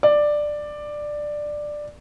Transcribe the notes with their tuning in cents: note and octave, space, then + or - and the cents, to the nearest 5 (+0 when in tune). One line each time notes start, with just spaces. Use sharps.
D5 +10